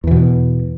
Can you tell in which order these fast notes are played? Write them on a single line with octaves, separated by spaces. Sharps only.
E2 E3 B2